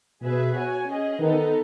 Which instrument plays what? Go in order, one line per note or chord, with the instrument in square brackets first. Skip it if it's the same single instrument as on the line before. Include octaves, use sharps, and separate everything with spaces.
[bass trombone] B2 [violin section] G#4 B4 E5
[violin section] F#4 C#5 G#5
C#4 G#4 D#5
[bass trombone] D#3 [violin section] B3 D#4 A4